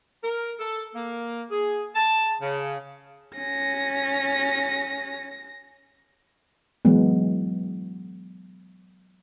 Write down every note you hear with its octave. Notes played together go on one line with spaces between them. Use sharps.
A#4
A4
A#3
G#4
A5
C#3
C#4 A#6
E3 F#3 G#3 B3